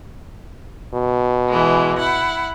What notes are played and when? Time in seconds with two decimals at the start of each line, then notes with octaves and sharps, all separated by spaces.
0.94 B2
1.49 E3 G#3
1.99 E4 F#5